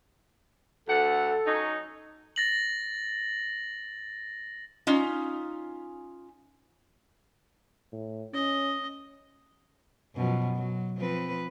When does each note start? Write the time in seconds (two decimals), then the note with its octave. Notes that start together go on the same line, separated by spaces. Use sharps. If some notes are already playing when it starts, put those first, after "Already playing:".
0.89 D2 A4 F#5
1.46 F#3 C#4 D#4
2.36 A6 A#6 F#7
4.87 C#4 D#4 F4
7.93 A2
8.34 C#4 D#5
10.15 F#2 B2 F3
10.55 F#3
10.97 F3 C4 B4